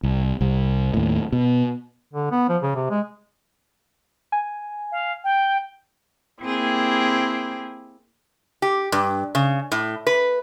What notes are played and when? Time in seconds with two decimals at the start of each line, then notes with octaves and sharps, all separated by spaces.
0.03 C2
0.41 C2
0.94 D#2 A2
1.33 B2
2.13 D3
2.31 B3
2.49 F3
2.62 C#3
2.75 C3
2.90 G#3
4.32 G#5
4.92 F5
5.24 G5
6.43 A#3 C4 E4 G4 G#4
8.62 G4
8.92 G2
9.35 C#3
9.72 A2
10.07 B4